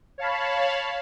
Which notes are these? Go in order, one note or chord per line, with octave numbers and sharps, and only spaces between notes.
C#5 F5 A5 B5